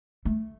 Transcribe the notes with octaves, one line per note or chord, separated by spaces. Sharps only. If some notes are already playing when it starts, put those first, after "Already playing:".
A3